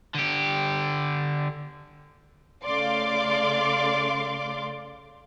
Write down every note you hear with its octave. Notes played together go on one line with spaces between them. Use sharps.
D3 G4
C#3 A3 D5 F5 C6 D6